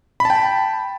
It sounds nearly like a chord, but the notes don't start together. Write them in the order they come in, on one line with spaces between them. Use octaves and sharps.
B5 A5 G5